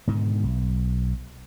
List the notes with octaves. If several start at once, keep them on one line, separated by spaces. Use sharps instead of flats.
G#2 B2 D3 D#3
B1